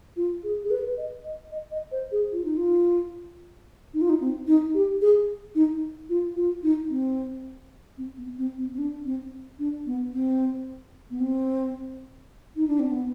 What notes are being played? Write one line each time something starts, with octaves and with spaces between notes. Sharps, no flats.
F4
G#4
G#4
B4
D#5
D#5
D#5
D#5
C5
G#4
F4
D#4
F4
D#4
F4
D#4
C4
D#4
G4
G#4
D#4
F4
F4
D#4
C4
C4
B3
C4
C4
C4
D4
C4
D4
B3
C4
B3
C4
D#4
D4
C4
B3